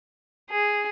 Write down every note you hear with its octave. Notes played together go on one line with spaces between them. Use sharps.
G#4